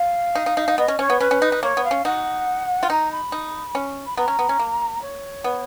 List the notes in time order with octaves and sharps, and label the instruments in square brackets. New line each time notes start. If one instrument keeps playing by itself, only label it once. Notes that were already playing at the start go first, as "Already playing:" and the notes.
Already playing: [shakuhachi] F5
[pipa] D#4
D#4
D#4
D#4
[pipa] B3 [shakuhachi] D#5
[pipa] C#4
[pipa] C#4 [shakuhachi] C#5
[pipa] B3
[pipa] C#4 [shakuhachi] B4
[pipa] C#4
D#4
D#4
[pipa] A#3 [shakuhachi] C#5
[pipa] B3
[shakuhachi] F5
[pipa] C#4
[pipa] D#4 [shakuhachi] F#5
[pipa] F4
[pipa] D#4 [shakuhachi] A#5
[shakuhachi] B5
[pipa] D#4
C#4
[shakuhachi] B5
[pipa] B3 [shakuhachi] A#5
[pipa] C#4
B3
C#4
A#3
[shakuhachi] C#5
[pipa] B3